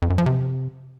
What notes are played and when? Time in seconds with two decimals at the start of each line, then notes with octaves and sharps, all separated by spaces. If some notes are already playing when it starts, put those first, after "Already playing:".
0.02 F2
0.10 F#2
0.18 F3
0.26 C3